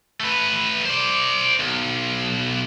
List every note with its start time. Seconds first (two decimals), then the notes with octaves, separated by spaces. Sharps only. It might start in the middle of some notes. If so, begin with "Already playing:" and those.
0.20 A3 B4
0.86 C5 D5
1.60 B1